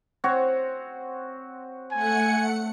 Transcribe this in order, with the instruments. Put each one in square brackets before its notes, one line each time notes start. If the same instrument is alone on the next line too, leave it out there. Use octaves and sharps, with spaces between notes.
[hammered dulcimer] C4 F#4 C#5
[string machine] A3 F#5 C#7 [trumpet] G#5